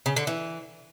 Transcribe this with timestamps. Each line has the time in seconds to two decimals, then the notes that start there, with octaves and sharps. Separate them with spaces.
0.06 C#3
0.16 D3
0.27 E3